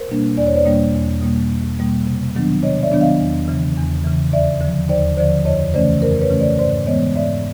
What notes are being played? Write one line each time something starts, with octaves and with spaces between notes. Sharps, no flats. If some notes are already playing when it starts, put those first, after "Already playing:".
Already playing: A#4 C5
B2 G3 A#3 D4
E2 D5
C#5
C5 D5
B2 G3 A#3 D4
E2
B2 G3 A#3
E2
B2 G3 A#3
C3
D#3 F#3 B3 D4
C3 C#5 D#5
D5 E5
D#3 F#3 B3 D4
D#5 F5
E2
C#3 E3
E2
C#3 E3
D#2 D5 E5
D3 F3
D#2 C5 D5
D3 F3 C5 D5
F2 C#5 D#5
C#3 E3 A3 C#4 C5 D5
F2 A#4 C5
B4 C#5
C#3 E3 A3 C#4
C5 D5
G#2 C5 D5
E3 G#3 B3 C#5 D#5
G#2 D5 E5